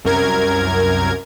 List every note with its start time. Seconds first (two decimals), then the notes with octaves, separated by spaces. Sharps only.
0.05 C2 F#2 A#4 G#6